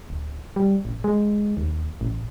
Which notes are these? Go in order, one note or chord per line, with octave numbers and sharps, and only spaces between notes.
D1
G3
A1
G#3
D#2
A1